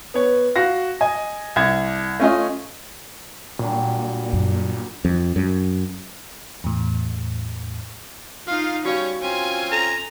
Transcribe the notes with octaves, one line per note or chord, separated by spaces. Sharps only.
B3 C#5
F#4 F5 A#6
D#5 G#5
C2 G#6
A3 C#4 F4 D#5
A#2 F#3 G3 D4
F#2
F2
F#2
E2 A2
D#4 F4 F5
G3 C#4 F#4 C#5 D5 F5
C4 C#4 F4 G#5
A4 A#5